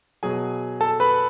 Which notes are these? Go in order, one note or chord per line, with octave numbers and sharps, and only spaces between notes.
B2 F#3 G#4 G#5
A4 A5
B4 B5